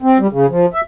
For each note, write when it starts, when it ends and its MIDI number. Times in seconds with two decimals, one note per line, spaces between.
0.02 0.18 60
0.20 0.27 55
0.32 0.46 49
0.50 0.66 53
0.74 0.81 76